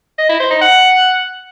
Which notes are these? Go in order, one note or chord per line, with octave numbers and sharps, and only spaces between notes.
D#5
E4
C5
D#4
F#5